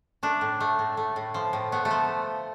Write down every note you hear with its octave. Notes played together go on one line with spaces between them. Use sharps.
A3 D4
A2
A3
A2
A3
A2
F3
A2
A3 B3
A3
F3